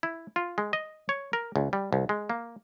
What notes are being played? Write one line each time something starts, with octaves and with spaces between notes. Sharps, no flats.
E4
F4
G#3
D#5
C#5
A#4
C#2
G3
C2
G#3
A#3